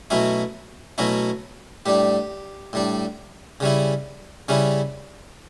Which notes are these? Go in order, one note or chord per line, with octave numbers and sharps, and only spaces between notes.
B2 F#3 A3 C#4 E4
B2 F#3 A3 C#4 E4
A2 G3 D4 G4
A2 G3 D4
C#3 G3 C#4 E4
C#3 G3 C#4 E4